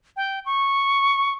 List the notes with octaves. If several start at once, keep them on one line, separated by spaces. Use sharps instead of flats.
G5
C#6